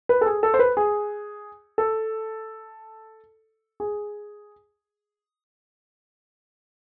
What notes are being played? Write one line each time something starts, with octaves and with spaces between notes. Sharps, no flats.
B4
A4
G#4
A4
C5
B4
G#4
A4
G#4